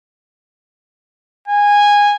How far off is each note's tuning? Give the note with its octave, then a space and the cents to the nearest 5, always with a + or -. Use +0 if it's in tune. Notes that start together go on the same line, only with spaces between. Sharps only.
G#5 -15